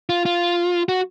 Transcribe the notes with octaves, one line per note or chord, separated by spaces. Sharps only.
F4
F4
F#4